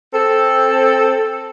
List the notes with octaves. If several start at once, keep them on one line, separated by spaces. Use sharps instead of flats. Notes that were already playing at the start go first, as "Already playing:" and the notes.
C4 A4